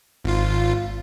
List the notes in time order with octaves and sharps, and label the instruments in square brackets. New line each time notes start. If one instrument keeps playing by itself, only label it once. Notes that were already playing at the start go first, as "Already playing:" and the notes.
[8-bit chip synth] G#1 F4